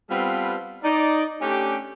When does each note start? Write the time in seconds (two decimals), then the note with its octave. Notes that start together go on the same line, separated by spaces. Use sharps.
0.10 G3 B3 C4 F4 A4 B4
0.84 D#4 D5
1.42 A3 C#4 D4 G4